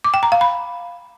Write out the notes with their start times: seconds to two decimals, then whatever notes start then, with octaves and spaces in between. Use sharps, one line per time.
0.04 D6
0.14 G5
0.23 A#5
0.32 F5
0.41 B5